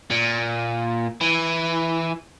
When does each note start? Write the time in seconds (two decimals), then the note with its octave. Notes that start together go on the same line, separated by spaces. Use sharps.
0.11 A#2
1.21 E3